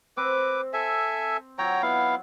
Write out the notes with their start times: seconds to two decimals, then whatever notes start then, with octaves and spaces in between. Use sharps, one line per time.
0.17 C4 B4 D6
0.73 A4 E5 G#5
1.58 F#3 F4 C#5 G5 A#5
1.82 B3 E4 F5